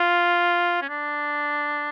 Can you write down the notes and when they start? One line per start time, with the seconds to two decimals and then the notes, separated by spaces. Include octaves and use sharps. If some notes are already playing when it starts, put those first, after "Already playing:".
Already playing: F4
0.82 C#4
0.89 D4